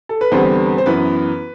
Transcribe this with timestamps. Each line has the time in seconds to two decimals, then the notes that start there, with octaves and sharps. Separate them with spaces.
0.09 A4
0.21 B4
0.31 E2 D3 G3 B3 C4 C5
0.78 C5
0.86 F#2 E3 B3 B4